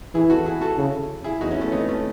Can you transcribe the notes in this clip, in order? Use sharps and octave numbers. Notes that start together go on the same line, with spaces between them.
E3 E4 G#4
F#4 A4
E4 G#4
F#4 A4
C#3
E4 G#4
E2 D#4 F#4
C#4 E4
A3 C#4
B3 D#4
A3 C#4